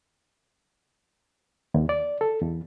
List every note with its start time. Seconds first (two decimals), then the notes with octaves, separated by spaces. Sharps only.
1.74 D#2
1.89 D5
2.21 A4
2.42 E2